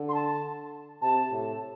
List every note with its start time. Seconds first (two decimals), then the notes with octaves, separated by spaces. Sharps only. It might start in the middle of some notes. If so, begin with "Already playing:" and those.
Already playing: D3
0.08 C6
0.14 A5
1.01 C3 A5
1.31 A2